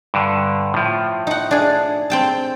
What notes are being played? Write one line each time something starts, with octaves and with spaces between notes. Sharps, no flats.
G2 D3
A2 F3
D#4 F#5
D4 G#4
C4 G5 A5